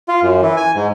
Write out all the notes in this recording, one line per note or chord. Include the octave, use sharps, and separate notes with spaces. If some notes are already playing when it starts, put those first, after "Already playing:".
F4
F#2
E3
G#5
G#2